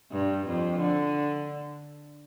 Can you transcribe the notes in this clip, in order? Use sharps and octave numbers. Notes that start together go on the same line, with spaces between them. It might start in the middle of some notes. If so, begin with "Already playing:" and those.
G2
F2
D3